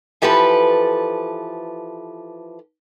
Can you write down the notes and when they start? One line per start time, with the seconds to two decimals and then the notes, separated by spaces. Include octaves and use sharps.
0.22 E3 F3 G4 A4 B4